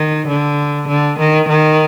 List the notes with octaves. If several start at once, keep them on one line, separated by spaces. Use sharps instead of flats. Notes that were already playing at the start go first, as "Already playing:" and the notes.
Already playing: D#3
D3
D3
D#3
D#3